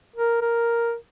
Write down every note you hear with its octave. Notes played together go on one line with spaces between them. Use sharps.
A#4
A#4